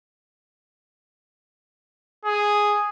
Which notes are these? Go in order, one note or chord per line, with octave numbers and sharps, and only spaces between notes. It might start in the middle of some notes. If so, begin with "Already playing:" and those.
G#4